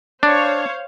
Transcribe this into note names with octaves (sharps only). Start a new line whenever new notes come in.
D4 C5 C#5 F5